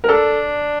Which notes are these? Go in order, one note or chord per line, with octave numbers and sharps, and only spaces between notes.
A#4
D4 A4